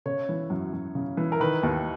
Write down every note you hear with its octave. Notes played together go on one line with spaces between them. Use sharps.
C#3 C#5
E3
F#2
F#2
C#3
E3
A#4
D#3 B4
D#2